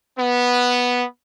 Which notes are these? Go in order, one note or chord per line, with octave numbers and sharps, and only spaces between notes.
B3